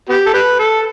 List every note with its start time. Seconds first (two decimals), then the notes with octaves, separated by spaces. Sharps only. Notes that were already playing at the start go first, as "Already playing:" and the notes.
0.09 B3 G4
0.26 A4
0.34 G4 B4
0.59 A4